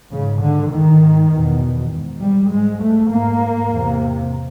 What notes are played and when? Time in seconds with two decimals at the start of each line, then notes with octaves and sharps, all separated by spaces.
0.12 G#2 C#3
0.42 D3
0.72 G#2 D#3
1.32 E2
1.37 B2
1.92 G#2
2.22 G3
2.51 G#2 G#3
2.81 A3
3.11 G#2 A#3
3.71 E2 C3